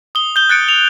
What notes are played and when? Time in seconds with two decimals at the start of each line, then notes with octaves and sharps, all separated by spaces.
0.15 D#6 G7
0.36 G6 G7
0.49 F#6 A6 C#7 D7
0.69 F7